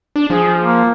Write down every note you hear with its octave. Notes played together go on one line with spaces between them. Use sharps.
D4
F3 G#4
A#3